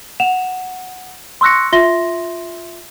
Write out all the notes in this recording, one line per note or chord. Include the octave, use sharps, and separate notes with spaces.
F#5 E7 F7
C6 C#6 E6 F#6 A#6 C#7
F4 E5 C6 A#6 G7